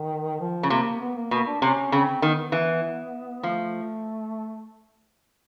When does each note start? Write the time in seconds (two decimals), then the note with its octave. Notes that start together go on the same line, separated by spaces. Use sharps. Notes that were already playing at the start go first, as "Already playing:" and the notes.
Already playing: D#3
0.40 F3
0.63 C#3
0.70 C3 A#3
1.01 B3
1.16 A#3
1.31 B2 A#3
1.46 D4
1.62 C3 C#4
1.92 C#3 C4
2.22 D#3 B3
2.52 E3
3.43 F3 A3